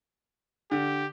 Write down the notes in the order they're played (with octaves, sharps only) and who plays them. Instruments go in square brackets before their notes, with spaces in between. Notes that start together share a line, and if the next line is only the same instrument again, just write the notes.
[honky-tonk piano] D3 [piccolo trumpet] G4